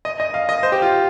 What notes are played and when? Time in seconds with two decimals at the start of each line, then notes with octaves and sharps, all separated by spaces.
0.05 D#5
0.20 D#5
0.34 F5
0.49 D#5
0.63 C5
0.72 G4
0.82 F4